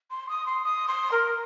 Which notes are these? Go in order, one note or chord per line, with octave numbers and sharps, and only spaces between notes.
C6
D#6
C6
D#6
C6
A#4